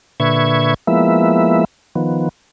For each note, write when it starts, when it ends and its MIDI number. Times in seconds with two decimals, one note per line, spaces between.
0.20 0.74 46
0.20 0.74 50
0.20 0.74 71
0.20 0.74 76
0.20 0.74 85
0.20 0.74 92
0.87 1.65 53
0.87 1.65 56
0.87 1.65 58
0.87 1.65 59
0.87 1.65 64
0.87 1.65 76
1.95 2.29 51
1.95 2.29 53
1.95 2.29 59